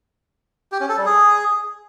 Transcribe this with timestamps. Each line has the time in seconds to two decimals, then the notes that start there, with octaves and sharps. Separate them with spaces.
0.72 G4
0.80 C#4
0.89 A4
0.97 G3
1.06 G#4